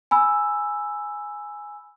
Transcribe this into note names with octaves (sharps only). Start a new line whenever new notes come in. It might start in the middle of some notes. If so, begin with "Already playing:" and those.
G#5 B5 E6